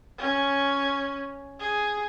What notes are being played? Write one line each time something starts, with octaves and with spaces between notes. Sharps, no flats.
C#4
G#4